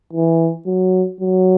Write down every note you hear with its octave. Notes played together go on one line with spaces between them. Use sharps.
E3
F#3
F#3